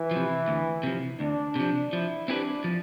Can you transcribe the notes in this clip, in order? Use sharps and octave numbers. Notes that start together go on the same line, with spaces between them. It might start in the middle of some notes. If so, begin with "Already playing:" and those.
Already playing: E3
C3 F3
D2
C3 F3
D2 D4
C3 F3
F3 E4
C4 D4 E4 G4 B4
F3